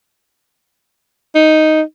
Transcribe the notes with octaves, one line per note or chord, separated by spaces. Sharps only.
D#4